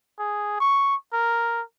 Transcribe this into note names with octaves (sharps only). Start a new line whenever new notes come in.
G#4
C#6
A#4